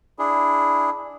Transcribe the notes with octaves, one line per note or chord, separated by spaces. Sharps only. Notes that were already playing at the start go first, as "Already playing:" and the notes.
D4 E4 G#4